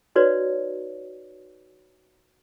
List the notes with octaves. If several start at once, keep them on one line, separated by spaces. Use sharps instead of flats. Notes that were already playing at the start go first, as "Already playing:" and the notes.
D#4 F#4 B4 C#5 D5